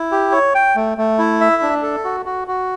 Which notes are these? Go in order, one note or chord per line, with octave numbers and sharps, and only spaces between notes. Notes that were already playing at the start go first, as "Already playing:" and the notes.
Already playing: E4
G4
C#5
G5
A3
A3
E4
E5
D4
A4
F#4
F#4
F#4